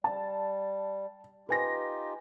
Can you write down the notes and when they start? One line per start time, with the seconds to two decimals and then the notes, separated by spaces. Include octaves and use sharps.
0.04 G3 A5
1.49 D#4 F4 G4 B4 G#5 A#6